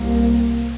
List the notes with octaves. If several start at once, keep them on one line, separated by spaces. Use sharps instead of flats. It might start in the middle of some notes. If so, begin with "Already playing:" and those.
Already playing: C2 C3 A#3